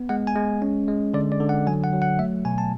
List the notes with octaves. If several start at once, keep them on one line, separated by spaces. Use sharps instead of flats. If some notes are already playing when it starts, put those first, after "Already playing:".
Already playing: B3
G#3 F#5
G#5
G#3
C#4
G#3
D3 D5
D5
D3
F#5
F#3 G#5
F#5
F#3
F#5
A3 E5
B2 G#5
A5